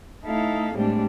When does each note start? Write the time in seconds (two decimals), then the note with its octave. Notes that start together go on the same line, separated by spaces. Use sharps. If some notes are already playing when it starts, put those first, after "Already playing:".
0.23 A3 D#4 E4 A4 F5
0.74 A2 G3 G#3 C4 D4